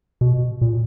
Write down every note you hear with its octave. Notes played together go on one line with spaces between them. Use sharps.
B2
A#2